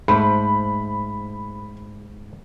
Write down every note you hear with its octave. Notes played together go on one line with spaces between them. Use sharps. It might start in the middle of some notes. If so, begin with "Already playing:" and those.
G#2 A3 C5 B5